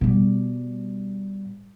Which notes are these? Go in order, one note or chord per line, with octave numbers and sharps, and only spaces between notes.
B2 G3